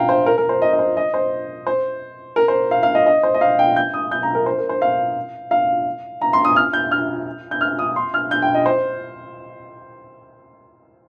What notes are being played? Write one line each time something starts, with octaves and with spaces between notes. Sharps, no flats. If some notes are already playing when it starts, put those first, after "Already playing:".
Already playing: F5 G5 A#5
C5
A#4
A#4
C5
D#5
D#5
C5
D#5
C5
C5
A#4
C5
F5
F5
D#5
D#5
C5
D#5
F5
G5
G6
D#6
G6
A#5
A#4
C5
A#4
C5
F5
F5
A#5
C6
D#6
F6
G6
F6
G6
F6
D#6
C6
F6
G6
G5
D#5
C5